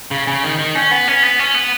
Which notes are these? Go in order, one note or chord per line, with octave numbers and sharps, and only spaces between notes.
C#3
C#3
D#3
D#3
C#4
B3
C#4
B3
C#4
B3